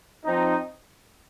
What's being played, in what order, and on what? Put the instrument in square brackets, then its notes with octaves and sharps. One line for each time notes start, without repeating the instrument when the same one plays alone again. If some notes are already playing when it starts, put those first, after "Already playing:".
[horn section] F3 C4 D#4